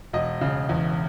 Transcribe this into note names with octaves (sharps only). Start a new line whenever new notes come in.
E1 D#5
C#3
E2